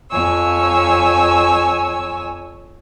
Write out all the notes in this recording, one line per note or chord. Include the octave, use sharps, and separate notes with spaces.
F2 C#5 G#5 E6